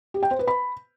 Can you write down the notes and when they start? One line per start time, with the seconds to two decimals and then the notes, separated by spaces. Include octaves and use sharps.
0.14 G4
0.23 G5
0.31 C5
0.39 B4
0.48 B5